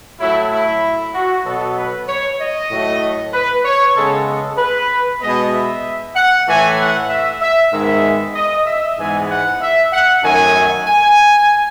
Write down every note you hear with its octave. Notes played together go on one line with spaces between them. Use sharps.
A2 F#3 A3 E4
E4
F#4
B2 F#3 B3 A4
B4
C#5
D#5
A2 F#3 A3
B4
C#5
C#3 G#3 B3 A4
A4
B4
B2 G#3 B3 D#5
E5
F#5
A2 E3 A3 G#5
F#5
E5
E5
G#2 D#3 G#3 B3 E5
D#5
E5
G#2 E3 G#3 B3 G#5
F#5
E5
F#5
F#2 D#3 A3 G#5
G#5